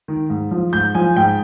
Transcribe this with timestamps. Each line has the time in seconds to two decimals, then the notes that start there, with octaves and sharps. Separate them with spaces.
0.08 D#3
0.30 G#2
0.51 F3
0.73 G#2 G6
0.95 F3 G#5
1.16 G#2 G5